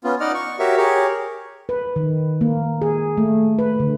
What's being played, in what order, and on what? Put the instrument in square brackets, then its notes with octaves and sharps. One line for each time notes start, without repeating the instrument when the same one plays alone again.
[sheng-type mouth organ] B3 C#4 F4
D#4 D5 D#5 F#5 F6
C#6
F#4 G4 A#4 C#5 E5
G4 G#4 A#4 C#5
[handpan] B4
D#3
A#3
G#4
A3
B4
D3